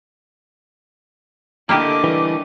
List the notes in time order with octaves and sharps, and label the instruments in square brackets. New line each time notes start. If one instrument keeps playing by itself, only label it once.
[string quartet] D3 A3 D#5 [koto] A#3 E4 G4 [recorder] D6
[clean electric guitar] E3 G3